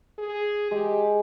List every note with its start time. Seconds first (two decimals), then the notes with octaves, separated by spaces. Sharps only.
0.18 G#4
0.71 G#3 G4